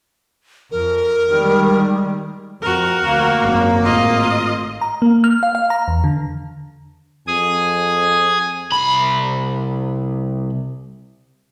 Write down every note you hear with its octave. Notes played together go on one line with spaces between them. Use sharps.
F2 A#4
D#3 G3 G#3
F2 F#4 A#4
D2 A#3
G#1 F#2
G#1 A2 F4 D#5
A#5
A#3
F6
F5
F5
A#5
E2
D3
F2 G#4 G#5 D#6
C2 B5